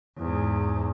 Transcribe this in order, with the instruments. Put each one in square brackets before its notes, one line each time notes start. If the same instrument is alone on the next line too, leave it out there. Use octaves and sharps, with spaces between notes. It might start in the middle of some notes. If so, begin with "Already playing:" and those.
[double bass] E2 G#2